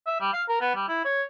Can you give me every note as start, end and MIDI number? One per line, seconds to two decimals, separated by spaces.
0.06 0.20 76
0.20 0.31 55
0.33 0.43 77
0.48 0.59 70
0.60 0.74 59
0.75 0.86 55
0.88 1.04 64
1.04 1.23 73